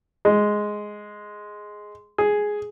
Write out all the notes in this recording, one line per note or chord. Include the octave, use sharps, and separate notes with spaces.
G#3
G#4